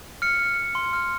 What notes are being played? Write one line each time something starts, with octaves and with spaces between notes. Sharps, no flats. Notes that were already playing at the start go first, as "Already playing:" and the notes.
F6 C#7
F6
F6
C6
F6